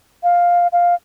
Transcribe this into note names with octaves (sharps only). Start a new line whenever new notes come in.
F5
F5